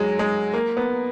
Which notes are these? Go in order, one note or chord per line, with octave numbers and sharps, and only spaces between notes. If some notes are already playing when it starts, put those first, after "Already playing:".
Already playing: F#3 G#3
G#3
A#3
B3